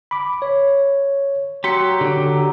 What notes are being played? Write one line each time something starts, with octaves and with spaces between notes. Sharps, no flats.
B5 D6
C#5
F#3 G4 C6 B6 C#7
D3 G4